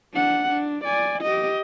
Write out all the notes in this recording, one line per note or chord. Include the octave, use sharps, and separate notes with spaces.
D4 F#5
D4
D5 G#5
G4 D#5